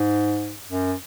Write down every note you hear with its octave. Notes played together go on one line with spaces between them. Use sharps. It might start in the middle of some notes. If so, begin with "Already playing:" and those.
Already playing: G#2
F#2